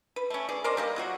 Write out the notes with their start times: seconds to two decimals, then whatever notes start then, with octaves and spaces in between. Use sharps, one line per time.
0.16 B4
0.30 A3 C#4
0.49 G#4 D5
0.64 A#4 C5 D5 D#5
0.77 G3 A#3 D#5
0.96 F#3 F4 F#4